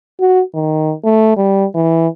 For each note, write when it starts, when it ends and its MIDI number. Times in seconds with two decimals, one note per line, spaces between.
0.20 0.42 66
0.54 0.93 51
1.04 1.35 57
1.37 1.65 55
1.75 2.07 52